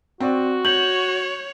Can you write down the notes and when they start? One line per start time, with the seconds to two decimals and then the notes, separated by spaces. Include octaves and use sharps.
0.20 C4 F#4 D5
0.65 C#5 G6 F#7